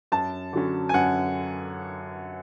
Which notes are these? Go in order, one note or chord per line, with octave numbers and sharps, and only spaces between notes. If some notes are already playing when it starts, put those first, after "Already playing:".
F#2 A5
D3 F#3 C#4
G#5
F#2 F#5